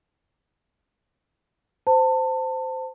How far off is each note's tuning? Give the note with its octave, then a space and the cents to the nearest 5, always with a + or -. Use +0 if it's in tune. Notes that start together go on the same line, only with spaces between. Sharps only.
C5 -15 A5 +25